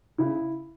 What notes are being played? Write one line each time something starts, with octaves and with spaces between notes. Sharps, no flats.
C#3 E4